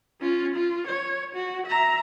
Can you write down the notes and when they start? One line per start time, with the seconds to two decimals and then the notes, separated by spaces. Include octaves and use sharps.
0.21 C#4 F4
0.55 F4
0.87 C#5
1.35 F#4
1.66 E5 A#5